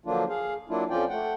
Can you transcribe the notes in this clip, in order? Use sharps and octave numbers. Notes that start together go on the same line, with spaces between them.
D3 F3 F#3 A#3 D4 F4
G#4 F5
F#3 A#3 D4 E4 F4
F2 F3 C#4 F4 D5 G5
A3 F#5 G5